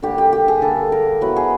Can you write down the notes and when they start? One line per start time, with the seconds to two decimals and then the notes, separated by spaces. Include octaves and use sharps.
0.02 D3 G3 A#3 G4
0.18 G4
0.33 G4
0.48 G#4
0.62 D3 G3 A#3 A4
0.92 A#4
1.21 F#3 B3 E4 B4
1.36 G#4